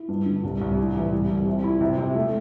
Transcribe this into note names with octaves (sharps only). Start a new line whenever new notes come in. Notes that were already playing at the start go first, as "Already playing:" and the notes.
Already playing: E4
G2
D3
C2
C2
A2
E3
C2
C2
C3
E4
C3
C3
A3